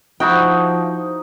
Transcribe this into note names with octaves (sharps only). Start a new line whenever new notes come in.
F3 D#4 E4 F#4 G5